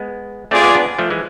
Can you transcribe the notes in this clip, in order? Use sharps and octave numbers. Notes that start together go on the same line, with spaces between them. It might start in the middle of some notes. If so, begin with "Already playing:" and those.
Already playing: G#3 B3
A3 C4 F4 G#4 D5
G#3 B3
B3 D4
F3 A3
E3 G#3